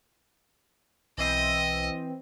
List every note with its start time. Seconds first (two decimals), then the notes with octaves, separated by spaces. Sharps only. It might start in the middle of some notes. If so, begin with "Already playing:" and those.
1.18 B1 E3 C4 D#5 E6